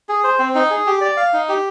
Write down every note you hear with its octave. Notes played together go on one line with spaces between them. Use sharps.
G#4
C5
C4
D#4
G#4
G4
D5
F5
D#4
G4